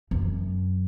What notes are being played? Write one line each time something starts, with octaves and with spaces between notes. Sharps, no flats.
F#2